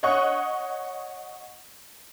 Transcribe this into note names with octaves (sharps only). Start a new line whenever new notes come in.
C#5 D#5 F#5 C#6 D#6 F#6